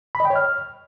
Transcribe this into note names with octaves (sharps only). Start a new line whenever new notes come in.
B5
D#5
G5
C#5
F6